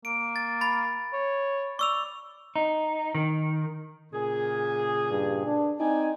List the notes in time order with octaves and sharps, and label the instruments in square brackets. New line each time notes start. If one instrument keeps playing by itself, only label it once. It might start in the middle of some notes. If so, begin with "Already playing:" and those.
[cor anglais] A#3 [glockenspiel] D7
[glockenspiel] A6
B5 A6
[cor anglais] C#5
[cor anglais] D5 [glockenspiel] C#6 E6 F7
[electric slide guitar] D#4
D#3
[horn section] A#2 C#3 G#4
[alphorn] G2
D4
[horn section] C4 D5 G#5 [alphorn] D#4